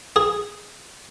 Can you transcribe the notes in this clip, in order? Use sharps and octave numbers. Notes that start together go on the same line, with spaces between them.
G#4